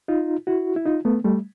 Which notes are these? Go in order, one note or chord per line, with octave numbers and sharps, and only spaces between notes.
D#4 F4
E4 F#4
E4
D#4 F4
A3 B3
G3 A3